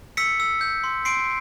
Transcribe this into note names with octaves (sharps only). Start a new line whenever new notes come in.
E6 B6 C#7
E6
G6
C6
C6 C7 D7